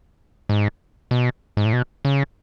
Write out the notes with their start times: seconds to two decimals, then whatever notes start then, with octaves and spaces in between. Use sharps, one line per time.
0.49 G#2
1.11 B2
1.57 G#2
1.65 A2
1.73 B2
2.05 C#3